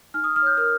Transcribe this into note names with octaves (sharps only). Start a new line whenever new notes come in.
D#4 F6
D#6
D#4
F6
C#5 G6
A#4 F6